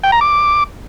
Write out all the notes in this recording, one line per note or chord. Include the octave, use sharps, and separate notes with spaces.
G5
A#5
D6